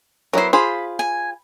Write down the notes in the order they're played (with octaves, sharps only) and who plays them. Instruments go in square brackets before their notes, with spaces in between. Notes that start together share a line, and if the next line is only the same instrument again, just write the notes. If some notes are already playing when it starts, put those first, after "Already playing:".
[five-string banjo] F#3 B3 E4 [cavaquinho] A#4 C5
[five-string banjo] F4 G#4 C5 [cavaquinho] B5
[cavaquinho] G#5